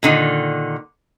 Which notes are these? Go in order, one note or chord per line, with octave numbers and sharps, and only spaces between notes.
A#2 D3 D#3